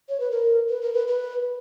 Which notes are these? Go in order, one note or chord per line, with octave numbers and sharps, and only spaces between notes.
C#5
B4
A#4
B4
A#4
B4
B4